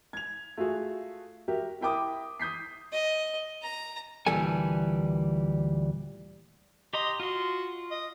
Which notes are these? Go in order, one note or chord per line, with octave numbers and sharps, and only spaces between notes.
G#6 F7
A3 F4 F#4 G#4
F#4 G4 A#4 E5
E4 A#4 G5 B5 D6 D#6
D#6 G6 B6 C7
D#5
A#5
D2 A#2 E3 G3 A4 G#5
G4 D#5 A#5 C6
F4 F#4 C6
D#5